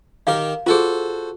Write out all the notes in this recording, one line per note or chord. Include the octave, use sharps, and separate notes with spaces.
D#3 G4 A#4 F5
F4 F#4 G#4 A4 C5